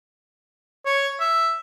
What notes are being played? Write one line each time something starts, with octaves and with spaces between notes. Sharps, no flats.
C#5
E5